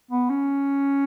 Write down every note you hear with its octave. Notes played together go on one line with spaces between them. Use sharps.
B3
C#4